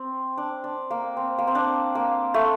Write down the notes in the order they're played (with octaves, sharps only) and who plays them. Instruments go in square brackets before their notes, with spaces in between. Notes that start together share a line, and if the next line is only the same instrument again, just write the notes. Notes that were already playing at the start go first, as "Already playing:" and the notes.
Already playing: [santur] C4
D4
D4
A#3
C4
A#3
C4
D4
A#3
A3